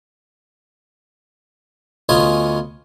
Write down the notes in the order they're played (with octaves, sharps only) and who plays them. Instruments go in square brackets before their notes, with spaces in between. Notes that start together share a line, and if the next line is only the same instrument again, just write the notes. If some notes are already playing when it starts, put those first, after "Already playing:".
[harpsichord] D2 B3 C#4 F4 D#5 G#5